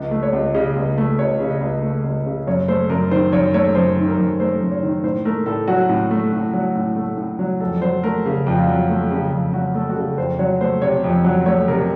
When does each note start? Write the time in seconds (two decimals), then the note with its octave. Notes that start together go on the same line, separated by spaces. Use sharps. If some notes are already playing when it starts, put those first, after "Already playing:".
Already playing: C#2
0.11 A3
0.23 C#5
0.33 C#2
0.54 C#3 D#5
0.76 C#2
0.98 A3
1.19 C#2 C#5
1.40 C#3
1.50 D#5
1.61 C#2
1.83 A3
2.04 C#2
2.26 C#3
2.47 F#2 C#5
2.68 A3 C5
2.89 F#2 A#4
3.11 D#3 C5
3.32 F#2 C#5
3.54 A3 C#5
3.75 F#2 C5
3.96 D#3
4.08 A#4
4.18 F#2
4.40 A3 C5
4.61 F#2
4.71 C#5
4.83 D#3
5.03 A2 C5
5.25 A3 A#4
5.46 A2 A4
5.68 F#3 F#4
5.89 A2
6.11 A3
6.33 A2
6.53 F#3
6.75 A2
6.96 A3
7.18 A2
7.39 F#3
7.61 F2 A4
7.82 F#3 C5
8.04 A3 A#4
8.26 C#3
8.46 F2
8.57 F4
8.68 F#3
8.89 A3
9.11 C#3
9.32 F2
9.53 F#3 F#4
9.74 A3 A4
9.89 F#4
9.96 C#3 A4
10.18 F2 C5
10.39 F#3 C#5
10.61 A3 C5
10.82 C3 C#5
11.04 F2
11.25 F#3
11.46 A3 C#5
11.68 C3 A#4